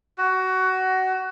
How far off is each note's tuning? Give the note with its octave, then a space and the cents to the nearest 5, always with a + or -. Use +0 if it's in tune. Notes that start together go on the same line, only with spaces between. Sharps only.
F#4 +20